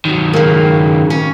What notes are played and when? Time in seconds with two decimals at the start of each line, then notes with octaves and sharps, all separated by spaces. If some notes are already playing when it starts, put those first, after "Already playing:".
0.05 D#3 F#3
0.33 C#3 A#3
1.10 C#4